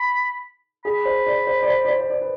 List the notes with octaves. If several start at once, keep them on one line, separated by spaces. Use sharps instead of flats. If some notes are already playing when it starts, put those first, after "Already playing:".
Already playing: B5
G#4 B5
C5
D5
C5
D5
C5
D5
C5
C5
D5
B4